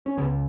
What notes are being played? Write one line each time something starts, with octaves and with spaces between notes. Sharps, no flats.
C#4
C#2 C#3 B3